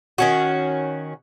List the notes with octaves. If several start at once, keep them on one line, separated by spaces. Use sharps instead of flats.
D#3 C#4 F#4